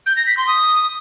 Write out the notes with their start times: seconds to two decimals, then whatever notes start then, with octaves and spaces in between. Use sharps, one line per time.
0.06 G6
0.17 A#6
0.27 B6
0.37 C6
0.47 D#6